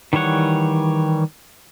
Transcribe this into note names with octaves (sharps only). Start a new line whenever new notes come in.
D#3 E3 G3 C#5 F#5